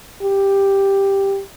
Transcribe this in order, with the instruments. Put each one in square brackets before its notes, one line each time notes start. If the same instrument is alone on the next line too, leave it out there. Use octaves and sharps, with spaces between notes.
[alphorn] G4